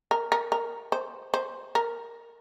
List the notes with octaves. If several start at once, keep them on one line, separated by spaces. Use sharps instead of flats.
A#4
A#4
A#4
C5
C5
A#4